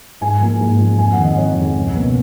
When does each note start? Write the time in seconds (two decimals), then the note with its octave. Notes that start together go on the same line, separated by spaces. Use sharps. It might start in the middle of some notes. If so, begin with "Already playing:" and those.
0.21 G#2 G#5
0.41 F3 A#3
0.60 G#2
0.79 F3 A#3
0.98 F2 G#5
1.12 F#5
1.18 D#3
1.23 G#3 D#5
1.37 F2 C#5
1.56 D#3 G#3
1.75 C#2
1.95 B2 A#3 C#4